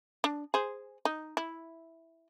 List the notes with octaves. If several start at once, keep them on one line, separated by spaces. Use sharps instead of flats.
D4
G#4 C5
D#4
E4